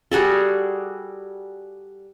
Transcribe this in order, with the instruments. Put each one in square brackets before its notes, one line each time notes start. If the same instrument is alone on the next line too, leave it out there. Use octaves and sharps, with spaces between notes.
[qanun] G3 F#4 G#4 A4